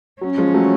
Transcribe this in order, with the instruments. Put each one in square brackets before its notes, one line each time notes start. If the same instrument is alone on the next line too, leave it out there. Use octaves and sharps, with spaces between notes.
[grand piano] F#3 [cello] C#4
[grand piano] F3 G#3
F#3 A3